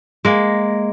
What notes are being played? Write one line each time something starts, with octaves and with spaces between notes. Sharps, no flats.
G#3 A#3